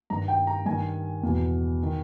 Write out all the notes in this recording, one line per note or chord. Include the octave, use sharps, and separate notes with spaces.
G2 D#3 A#5
G5
A#5
G2 D#3 G#5
E2 B2
D#3